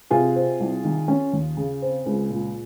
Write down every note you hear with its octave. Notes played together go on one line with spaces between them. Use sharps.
C3 F4 G#4
C4
C2
D#3
C#4
D#2
C#3
C4
C#2
A#2